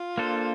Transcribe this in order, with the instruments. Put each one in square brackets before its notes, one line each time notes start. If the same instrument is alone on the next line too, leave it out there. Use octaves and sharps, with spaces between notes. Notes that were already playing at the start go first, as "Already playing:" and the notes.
Already playing: [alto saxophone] F4
[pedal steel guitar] A#3 D4 A4 C5